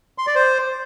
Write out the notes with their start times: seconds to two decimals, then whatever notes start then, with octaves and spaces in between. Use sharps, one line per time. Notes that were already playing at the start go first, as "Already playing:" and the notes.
0.18 C6
0.27 D5
0.35 C5